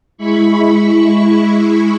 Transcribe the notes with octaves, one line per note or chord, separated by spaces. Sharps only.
G#3 E4 B5 C#6